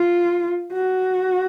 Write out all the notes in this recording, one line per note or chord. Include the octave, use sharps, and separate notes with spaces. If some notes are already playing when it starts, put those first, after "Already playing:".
Already playing: F4
F#4